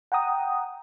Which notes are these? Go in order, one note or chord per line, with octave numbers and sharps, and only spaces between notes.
F#5 G5 A#5 D#6